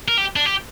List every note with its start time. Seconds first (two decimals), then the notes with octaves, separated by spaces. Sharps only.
0.08 A#4
0.18 G4
0.36 D4
0.45 G4